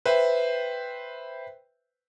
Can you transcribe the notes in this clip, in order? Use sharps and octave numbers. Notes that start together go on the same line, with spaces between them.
B4 C5 E5 G5